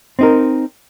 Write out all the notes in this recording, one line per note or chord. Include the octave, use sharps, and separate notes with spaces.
C4 D#4 A#4